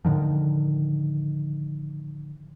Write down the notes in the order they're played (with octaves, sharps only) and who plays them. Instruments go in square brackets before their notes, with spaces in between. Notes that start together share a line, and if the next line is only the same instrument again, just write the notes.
[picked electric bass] A2 D3 D#3 F3